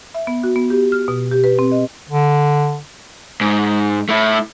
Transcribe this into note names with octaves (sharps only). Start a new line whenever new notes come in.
E5
B3
F#4
B3
G4
F6
B2
G4
B4
C4
D#5
D3
G#2
A3 E4